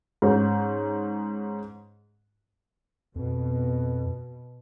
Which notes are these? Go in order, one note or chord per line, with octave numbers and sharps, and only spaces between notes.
G#2 C#4
F2 B2